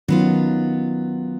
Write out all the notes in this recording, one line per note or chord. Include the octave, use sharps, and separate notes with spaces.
D#3 F#3 B3 C#4 F4